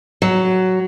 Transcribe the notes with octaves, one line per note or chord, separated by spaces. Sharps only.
F#3